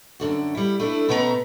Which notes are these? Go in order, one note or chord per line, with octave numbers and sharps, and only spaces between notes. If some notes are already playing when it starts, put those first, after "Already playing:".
F#2 D3 F#4
G3 E4
A3 D4 E4
B2 A3 B3 C#4 G4 A#5